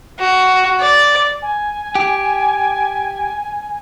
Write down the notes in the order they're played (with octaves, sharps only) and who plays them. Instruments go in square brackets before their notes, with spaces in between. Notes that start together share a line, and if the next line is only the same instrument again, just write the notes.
[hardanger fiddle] F#4
D5
[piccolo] G#5
[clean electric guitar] G4